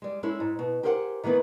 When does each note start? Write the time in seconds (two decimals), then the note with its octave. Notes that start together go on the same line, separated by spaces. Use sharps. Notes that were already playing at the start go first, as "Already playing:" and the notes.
0.02 G3 G#3
0.23 G#3 C#4 E4 A4
0.40 G#2
0.59 B2
0.83 G4 G#4 A#4 C5 C#5 F#5
1.24 D#3 E3 A3 B3 D#4